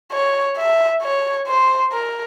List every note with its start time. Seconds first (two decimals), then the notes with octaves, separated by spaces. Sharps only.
0.12 C#5
0.57 E5
1.02 C#5
1.47 C5
1.92 A#4